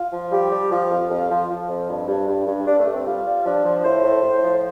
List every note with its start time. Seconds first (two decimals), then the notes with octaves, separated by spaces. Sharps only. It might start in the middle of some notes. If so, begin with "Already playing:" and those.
Already playing: F4
0.13 F3
0.32 G3 G4
0.52 G3
0.72 F3 F4
0.91 F2
1.11 F2
1.31 F3
1.50 F3
1.69 F2
1.89 G2
2.08 G2
2.28 G2
2.47 G2
2.67 G2 D4
2.80 A3
2.86 G2
2.94 C4
3.06 G3 F4
3.26 G3
3.46 F3 D4
3.65 F3
3.85 A2 C5
4.05 A2
4.23 A2
4.43 F3